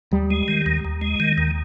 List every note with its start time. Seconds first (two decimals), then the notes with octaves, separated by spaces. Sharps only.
0.12 D#2 G3
0.31 G#3
0.48 D#3
0.66 D#2
0.85 D#2
1.01 G#3
1.20 D#3
1.38 D#2